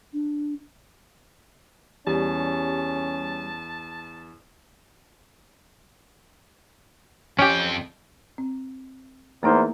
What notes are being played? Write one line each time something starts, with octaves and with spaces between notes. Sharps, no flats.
D4
E2 G3 C#4 A5
F2 C#4 G4 G5
C4
E2 A3 A#3 D#4 A#4 C5